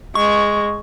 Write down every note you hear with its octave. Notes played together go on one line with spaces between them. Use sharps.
G#3 C#6